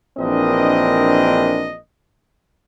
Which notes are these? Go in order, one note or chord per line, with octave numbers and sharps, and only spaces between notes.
A#1 E3 C4 D4 A#4 D#5